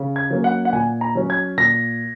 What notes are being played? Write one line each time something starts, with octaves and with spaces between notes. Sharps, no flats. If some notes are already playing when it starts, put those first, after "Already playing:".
Already playing: C#3
G#6
F#3 A#3 C#4
F#5
F#5
A#2 G#5
A#5
F#3 C#4
G#6
A#2 A#6